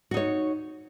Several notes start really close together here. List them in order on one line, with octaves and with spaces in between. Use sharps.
F#4 D#4 C#5